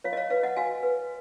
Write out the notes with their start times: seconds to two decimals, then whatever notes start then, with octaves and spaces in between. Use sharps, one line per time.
0.04 F4 C#5 F5
0.13 D#5
0.17 C#5 F5
0.30 B4 C#5 F5
0.43 D#5 F#5
0.56 F#4 F5 G#5
0.83 B4